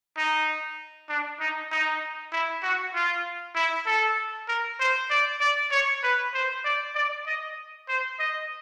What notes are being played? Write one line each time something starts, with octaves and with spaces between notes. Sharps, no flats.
D#4
D4
D#4
D#4
E4
F#4
F4
E4
A4
A#4
C5
D5
D5
C#5
B4
C5
D5
D5
D#5
C5
D#5